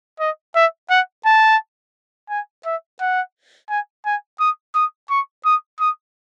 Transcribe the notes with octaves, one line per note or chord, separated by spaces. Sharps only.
D#5
E5
F#5
A5
G#5
E5
F#5
G#5
G#5
D#6
D#6
C#6
D#6
D#6